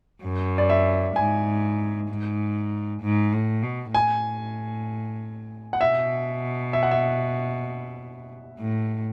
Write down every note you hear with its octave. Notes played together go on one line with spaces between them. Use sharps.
F#2
D5
E5
G#2 G#5
G#2
G#2
A2
B2
A2 G#5
F#5
B2 E5
E5
F#5
E5
A2